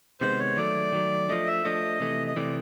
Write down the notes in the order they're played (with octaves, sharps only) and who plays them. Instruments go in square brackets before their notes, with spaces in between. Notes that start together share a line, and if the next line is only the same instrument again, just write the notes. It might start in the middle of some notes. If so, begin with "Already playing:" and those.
[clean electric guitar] C3 D#3 G#3 B3 [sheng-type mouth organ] C5
[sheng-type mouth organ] C#5
[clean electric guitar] D#3 F#3 A3 [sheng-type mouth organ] D5
[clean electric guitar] D#3 F#3 A3
[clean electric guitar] F3 A3 D4 [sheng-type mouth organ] D#5
[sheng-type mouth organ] E5
[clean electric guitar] F3 A3 D4 [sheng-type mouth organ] D#5
[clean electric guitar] C3 E3 A3
[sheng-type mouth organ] D#5
[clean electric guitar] C3 E3 A3 [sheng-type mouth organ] D5